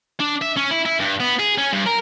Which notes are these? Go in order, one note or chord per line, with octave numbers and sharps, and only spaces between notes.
D4
E5
C#4
E4
E4
G2
B3
G#4
C#4
G2
A#4